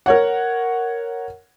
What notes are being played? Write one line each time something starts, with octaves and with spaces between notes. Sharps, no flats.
A#4 C#5 F#5